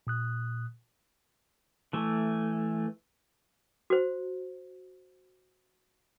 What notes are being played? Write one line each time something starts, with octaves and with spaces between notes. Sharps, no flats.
A#2 D#6 F#6
E3 A3
F#4 C5